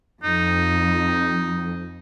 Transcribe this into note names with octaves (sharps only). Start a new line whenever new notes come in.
F2 D#4